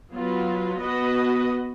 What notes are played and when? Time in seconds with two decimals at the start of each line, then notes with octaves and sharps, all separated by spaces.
0.12 F#3 B3 F4 B4
0.79 B3 F#4 B4 D#5